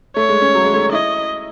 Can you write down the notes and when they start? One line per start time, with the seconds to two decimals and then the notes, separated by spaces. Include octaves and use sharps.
0.16 A3 C#5
0.29 G#3
0.42 C#4
0.54 F#3
0.64 G#3
0.74 A3
0.83 C#4
0.92 E4 D#5